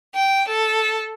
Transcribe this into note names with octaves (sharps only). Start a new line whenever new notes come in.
G5
A4